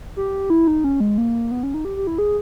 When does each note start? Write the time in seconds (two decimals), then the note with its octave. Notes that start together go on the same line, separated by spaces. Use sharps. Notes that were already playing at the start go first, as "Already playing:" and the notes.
0.16 G4
0.50 E4
0.67 D#4
0.84 C#4
1.00 G#3
1.18 A#3
1.51 B3
1.63 C#4
1.74 D#4
1.85 G4
1.96 G4
2.07 E4
2.18 G#4